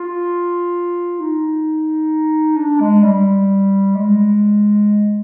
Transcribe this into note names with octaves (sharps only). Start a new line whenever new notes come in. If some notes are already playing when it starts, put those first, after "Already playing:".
Already playing: F4
D#4
D4
G#3
G3
G#3